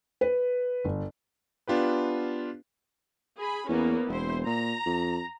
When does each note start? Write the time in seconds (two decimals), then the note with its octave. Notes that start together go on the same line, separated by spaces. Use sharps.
0.21 B4
0.84 G1
1.68 B3 D4 F4 G4 B4
3.40 G#4 B5
3.69 E2 A#3 B3 C#4
4.08 E1 E4 C5
4.46 A#2 A#5
4.86 F2